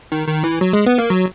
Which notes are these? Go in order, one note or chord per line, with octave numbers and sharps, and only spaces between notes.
D#3
D#3
E3
F#3
G#3
B3
A#3
F#3